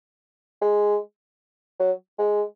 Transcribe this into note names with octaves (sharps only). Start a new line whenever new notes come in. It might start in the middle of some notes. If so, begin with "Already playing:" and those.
G#3
F#3
G#3